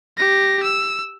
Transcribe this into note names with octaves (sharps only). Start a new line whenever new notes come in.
G4 A#6
E6